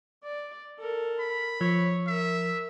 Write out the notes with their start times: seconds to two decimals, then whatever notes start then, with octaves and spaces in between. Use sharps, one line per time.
0.25 D5
0.79 A4 A#4
1.19 B5
1.61 F3 C#5
2.07 A#4 E5